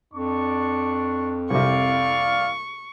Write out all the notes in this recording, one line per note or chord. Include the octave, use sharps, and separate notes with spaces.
F2 D4 C#6
C2 C3 E4 D5 F5 C#6